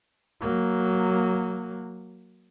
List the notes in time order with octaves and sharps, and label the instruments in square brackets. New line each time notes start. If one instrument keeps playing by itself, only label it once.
[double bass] F#3 A#3